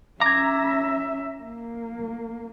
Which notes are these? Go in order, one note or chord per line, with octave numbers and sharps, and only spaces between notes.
C#4 E5 A#5 D6 G#6
A#3